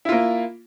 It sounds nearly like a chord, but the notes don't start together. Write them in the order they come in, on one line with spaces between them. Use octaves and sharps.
E4 F4 A#3